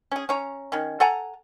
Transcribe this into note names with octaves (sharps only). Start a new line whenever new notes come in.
C#4 G#4
C#4 C#5 A#5
D#3 C#4
A4 F#5 G#5 A#5